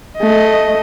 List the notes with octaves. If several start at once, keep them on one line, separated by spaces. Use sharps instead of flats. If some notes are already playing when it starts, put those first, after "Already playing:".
A3 D#5